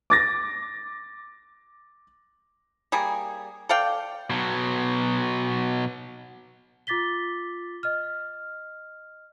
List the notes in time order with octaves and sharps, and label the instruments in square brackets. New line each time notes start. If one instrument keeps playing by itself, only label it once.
[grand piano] D6 A6 A#6
[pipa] G3 A#3 G#4
A4 D5 F5 G5
[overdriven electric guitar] B2 F#3
[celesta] F4 D6 A6 B6 G7
D#5 F6